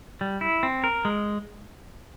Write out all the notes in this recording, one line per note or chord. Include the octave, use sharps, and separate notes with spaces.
G3
E4
C4
A#4
G#3